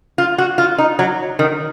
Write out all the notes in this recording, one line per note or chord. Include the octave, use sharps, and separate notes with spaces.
F4
F#4
F4
D#4
F#3
D#3